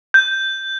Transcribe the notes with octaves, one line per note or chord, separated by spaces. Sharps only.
G6